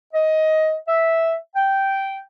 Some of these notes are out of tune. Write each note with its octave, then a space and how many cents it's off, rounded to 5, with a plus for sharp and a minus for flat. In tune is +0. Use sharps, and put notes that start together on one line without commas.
D#5 +15
E5 -5
G5 -10